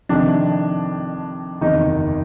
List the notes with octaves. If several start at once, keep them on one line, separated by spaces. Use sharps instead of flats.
F2 C3 D#3 D4
F#1 E2 C3 D#3 D#4